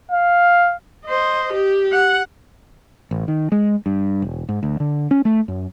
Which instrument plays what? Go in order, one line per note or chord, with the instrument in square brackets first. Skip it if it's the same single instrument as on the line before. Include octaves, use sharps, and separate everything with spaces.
[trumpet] F5
[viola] C5 D#5
G4
F#5
[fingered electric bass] A1
D#3
G#3
G2
E1
G#2
D2
D3
C#4
A3
F#2